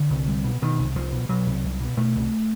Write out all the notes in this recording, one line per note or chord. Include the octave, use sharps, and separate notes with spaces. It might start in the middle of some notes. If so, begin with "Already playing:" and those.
Already playing: D3
C2
C2
B2
B2 D#3
C2
C2 F3
B2
B2 F#3
C2
C2
B2
B2 A3
C2